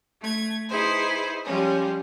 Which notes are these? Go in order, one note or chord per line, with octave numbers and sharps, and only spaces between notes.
A3 G#6
D#4 E4 G#4 B4 C5
F3 G3 G#3 C#4